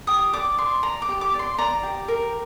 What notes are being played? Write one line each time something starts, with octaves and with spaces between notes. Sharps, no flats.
G4 D#6
D5 D6
D5 C6
D5 A#5
D6
G4
D6
D5
C6
D5 A#5
G4
A#4